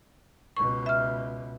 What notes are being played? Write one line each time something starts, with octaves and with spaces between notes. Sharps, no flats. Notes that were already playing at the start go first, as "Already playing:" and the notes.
C#2 B2 C#6
E5 F6